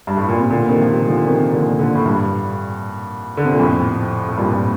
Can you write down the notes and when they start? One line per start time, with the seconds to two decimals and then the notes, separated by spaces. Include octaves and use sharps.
0.07 G2
0.17 A2
0.28 A#2
0.39 C3
0.50 A#2 D3
0.69 C3 D#3
0.81 F3
0.89 C3 D#3
1.07 D3 F3
1.27 C3 D#3
1.53 A#2 D3
1.79 A#2 D3
1.95 A2
2.05 G2
3.37 D3
3.45 C3
3.52 A#2
3.59 F2 A2
4.28 A2
4.37 G2 A#2
4.51 A#2